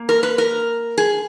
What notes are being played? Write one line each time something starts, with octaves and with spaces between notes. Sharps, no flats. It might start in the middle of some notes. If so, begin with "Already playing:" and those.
Already playing: A#3
A#4
B4
A#4
G#4